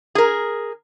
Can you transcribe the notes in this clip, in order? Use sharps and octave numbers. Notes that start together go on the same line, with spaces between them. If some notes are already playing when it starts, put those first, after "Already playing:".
G#4 A#4